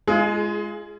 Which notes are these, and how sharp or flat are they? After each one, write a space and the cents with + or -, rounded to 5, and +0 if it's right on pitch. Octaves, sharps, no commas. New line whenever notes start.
G#3 +0 F4 -30 G#4 +25